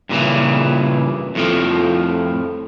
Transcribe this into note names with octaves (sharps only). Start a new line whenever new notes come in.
G2 A#2 C#3 E3
F2 A2 F3